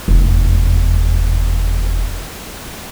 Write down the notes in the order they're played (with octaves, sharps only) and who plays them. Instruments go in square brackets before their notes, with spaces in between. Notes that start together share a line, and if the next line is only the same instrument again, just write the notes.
[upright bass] F1 E2